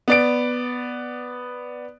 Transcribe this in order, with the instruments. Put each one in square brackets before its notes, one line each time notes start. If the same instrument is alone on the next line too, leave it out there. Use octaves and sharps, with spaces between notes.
[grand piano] B3 D5 D7